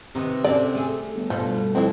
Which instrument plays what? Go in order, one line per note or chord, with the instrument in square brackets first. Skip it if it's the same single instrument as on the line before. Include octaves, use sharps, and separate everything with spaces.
[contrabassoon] C3 [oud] D#3 B3
[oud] D3 C4 C#4 [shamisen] D5
[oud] A3 G#4
[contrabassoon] G1
[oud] G2 B2 A3 [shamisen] F3
[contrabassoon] F2 [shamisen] C4 E4